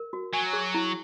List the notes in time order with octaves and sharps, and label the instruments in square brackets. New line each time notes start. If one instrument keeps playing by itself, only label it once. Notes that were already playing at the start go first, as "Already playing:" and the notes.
Already playing: [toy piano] A#4
F#4
[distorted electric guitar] F#3 [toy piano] G#5
[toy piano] G#4
E4